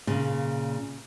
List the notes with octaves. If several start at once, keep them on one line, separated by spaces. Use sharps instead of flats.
A#2 C#3